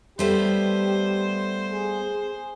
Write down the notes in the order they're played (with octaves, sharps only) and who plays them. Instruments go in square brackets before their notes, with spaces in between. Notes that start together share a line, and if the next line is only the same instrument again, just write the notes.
[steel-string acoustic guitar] G3 A3 B3 [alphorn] G4 [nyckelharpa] C5
[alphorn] G#4